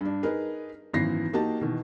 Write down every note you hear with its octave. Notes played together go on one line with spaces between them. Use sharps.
G2 D4
D#4 G#4 A#4 B4
G#1 F#2 E3 B3 A#6 C7
A#3 D#4 F#4 G4 A5
B2 D#3 E3